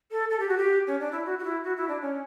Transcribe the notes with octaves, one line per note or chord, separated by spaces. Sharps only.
A4
A4
G4
F#4
G4
C#4
D4
E4
F#4
F#4
E4
F#4
E4
D4
C#4